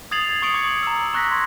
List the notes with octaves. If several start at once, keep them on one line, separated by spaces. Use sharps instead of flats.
D#6 G#6 A6 C7 F7 F#7
C#6 D#6 G#6 C#7 D7 F#7
D6 G#6 C#7
A#5 E6
A#5 C#6 F#6 G#6 A#6 B6
C6